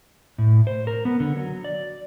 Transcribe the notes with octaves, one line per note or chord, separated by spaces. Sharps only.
A2
C5
A#4
B3
D3
F#3
D5